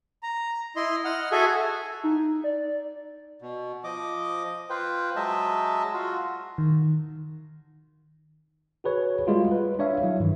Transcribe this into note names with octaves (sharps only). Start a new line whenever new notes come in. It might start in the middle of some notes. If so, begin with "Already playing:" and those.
A#5
E4 D#5 C6
D#5 F#5 F6
F#4 G#4 A4 E5 G#5
D#4
D5
B2
F3 D#5 D6
F4 B4 C5 G5
F#3 G#3 D#5 E5 A5
F4 F#4
D#3
F#4 G#4 B4 C#5
G3 G#3 F4 F#4
B4
D4 C#5 E5 F5
F#3 E4
G2 D#3 E3